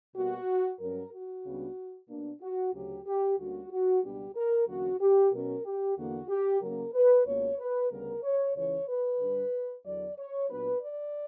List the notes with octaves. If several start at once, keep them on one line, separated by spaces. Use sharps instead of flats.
B2 G3 A#3 F#4
G2 F#3 C#4 A#4
F#4
C#2 C#3 G3 B3 D4
B2 A#3 D4
F#4
D2 C#3 F#3 G4
G4
D2 D3 G3 A#3 C#4 F#4
F#4
C#2 B2 G3 B3 D4 G4
A#4
E2 D3 F#3 A#3 C#4 F#4
G4
B2 F#3 C#4 A#4
G4
E2 D3 A#3 F#4
G4
C#3 F#3 A#3 C#4 A#4
B4
C#2 B2 A#3 C#5
B4
D2 C#3 G3 B3 A#4
C#5
C#2 C#3 E3 C#5
B4
G2 D3 G3
E2 D3 F#3 D5
C#5
A#2 F#3 B3 D4 B4
D5